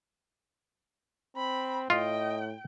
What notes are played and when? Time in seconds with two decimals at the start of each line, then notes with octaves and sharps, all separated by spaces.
1.36 C4 B5
1.90 A2 F4 D#5 G5